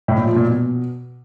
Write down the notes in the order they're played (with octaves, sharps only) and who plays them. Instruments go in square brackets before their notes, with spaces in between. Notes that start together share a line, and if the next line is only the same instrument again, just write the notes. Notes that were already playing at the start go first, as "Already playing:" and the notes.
[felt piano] A2
A#2
F3
A#2
B2